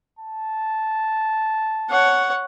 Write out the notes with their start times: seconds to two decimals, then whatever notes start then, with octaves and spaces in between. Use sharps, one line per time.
0.19 A5
1.90 C#5 F#5